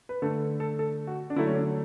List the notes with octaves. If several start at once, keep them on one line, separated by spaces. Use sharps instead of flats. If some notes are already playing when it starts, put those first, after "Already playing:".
B4
D3 A3 A4
A4
A4
F#4
D4
D3 F#3 A3 E4
C#4
D4